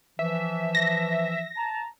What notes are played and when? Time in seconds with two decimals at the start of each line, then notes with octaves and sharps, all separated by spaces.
0.19 E3 F3 E5
0.75 A#6
1.57 A5 A#5